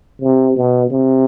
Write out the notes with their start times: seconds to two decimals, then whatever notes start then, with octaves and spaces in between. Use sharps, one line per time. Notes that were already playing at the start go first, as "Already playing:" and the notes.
0.21 C3
0.56 B2
0.90 C3